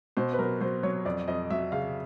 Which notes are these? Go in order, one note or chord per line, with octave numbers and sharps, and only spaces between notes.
B2 C5
B4
F#3 A#4
F#3 C5
F#3 C#5
F2 D5
F2 D#5
F#3 E5
C#3 F5